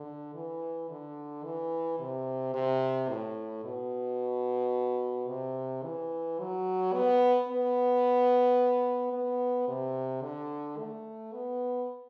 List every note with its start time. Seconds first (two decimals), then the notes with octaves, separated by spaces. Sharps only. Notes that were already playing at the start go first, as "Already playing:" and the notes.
Already playing: D3
0.34 E3
0.90 D3
1.44 E3
1.99 C3
2.54 C3
3.09 A2
3.65 B2
5.28 C3
5.84 E3
6.39 F#3
6.93 B3
7.49 B3
9.13 B3
9.68 C3
10.22 D3
10.78 A3
11.33 B3